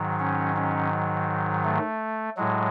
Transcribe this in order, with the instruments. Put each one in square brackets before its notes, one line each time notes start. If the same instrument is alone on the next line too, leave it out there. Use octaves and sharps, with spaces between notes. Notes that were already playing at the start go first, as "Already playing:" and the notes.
Already playing: [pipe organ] G#2 D#3 F#3
C#4
C#4
A3
A2 F#3 G#3